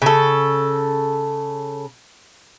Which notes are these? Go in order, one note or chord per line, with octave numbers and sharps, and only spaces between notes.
C#3 A4